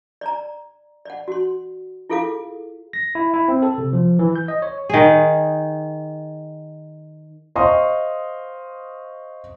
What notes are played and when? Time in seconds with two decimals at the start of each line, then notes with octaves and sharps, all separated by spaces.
0.21 D5 A#5
1.05 D5 F#5
1.28 F#4 C6
2.10 E4 F4 G#4 A4 F5 D6
2.93 A#6
3.15 E4
3.33 E4
3.48 C4
3.62 A4
3.78 C3
3.93 F3
4.19 E3
4.36 G6
4.48 D#5
4.62 C#5
4.89 D#3 G#4
7.55 C5 D#5 F5 C6 C#6 D#6